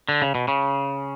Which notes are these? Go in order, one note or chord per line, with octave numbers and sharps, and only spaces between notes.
D3
C#3
B2
C#3